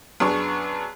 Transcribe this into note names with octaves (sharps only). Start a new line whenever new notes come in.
F#2 B3 D4 G#4 C#6 F7